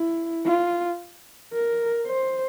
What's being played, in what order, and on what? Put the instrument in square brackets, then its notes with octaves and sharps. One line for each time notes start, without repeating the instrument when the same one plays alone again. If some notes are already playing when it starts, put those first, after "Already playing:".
Already playing: [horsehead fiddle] E4
F4
A#4
C5